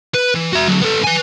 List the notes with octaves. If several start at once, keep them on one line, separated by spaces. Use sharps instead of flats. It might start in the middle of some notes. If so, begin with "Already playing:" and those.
B4
E3
F#4 E5
D3 F#3
B3 A4
B4 G#5